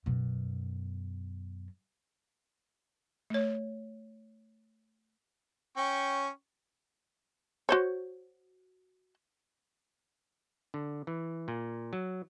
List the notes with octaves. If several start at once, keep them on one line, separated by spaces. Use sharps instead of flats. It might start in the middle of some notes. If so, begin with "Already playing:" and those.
F#2 B2
A3 C#5
C#4 G5 C#6
F#4 C5 C#5
D3
E3
A#2
F#3